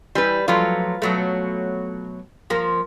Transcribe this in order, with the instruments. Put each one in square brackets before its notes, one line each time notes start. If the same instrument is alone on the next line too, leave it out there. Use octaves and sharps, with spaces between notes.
[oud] E3 [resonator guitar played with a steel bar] G3 B4
[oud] F3 F#3 A3 [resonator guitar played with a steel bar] F4 B4
[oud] B2 F#3 A3
F3 A#3